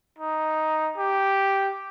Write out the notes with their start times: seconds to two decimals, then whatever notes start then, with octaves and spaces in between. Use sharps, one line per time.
0.19 D#4
0.98 G4